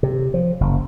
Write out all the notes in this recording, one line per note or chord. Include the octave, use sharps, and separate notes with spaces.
C3
F3
F#1